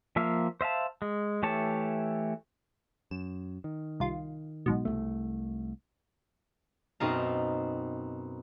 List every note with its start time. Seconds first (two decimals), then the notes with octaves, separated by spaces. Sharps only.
0.16 F3 A#3 E5 F5
0.61 C5 E5 F5 A5
1.02 G#3
1.43 E3 A3 G4 C#5 A5
3.11 F#2 E7
3.64 D#3
4.00 C2 F4
4.66 B1 G#2 B2
4.85 C2 A3
7.00 F#2 B2 C4 D#4 F5 A#5